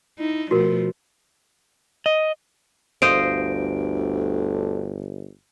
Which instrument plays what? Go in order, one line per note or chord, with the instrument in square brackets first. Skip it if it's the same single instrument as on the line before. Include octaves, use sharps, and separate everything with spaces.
[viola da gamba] D#4 E4
[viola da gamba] B2 F3 A3 [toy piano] F#4 A#4
[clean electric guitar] D#5
[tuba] G1 [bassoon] D2 [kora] C5 D#5 F5 [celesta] D7